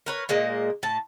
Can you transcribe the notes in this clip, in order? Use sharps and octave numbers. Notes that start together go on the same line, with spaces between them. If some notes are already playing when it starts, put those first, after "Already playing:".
A#4 B4 C#5
A#2 G#3 A#3 D#5
A2 A5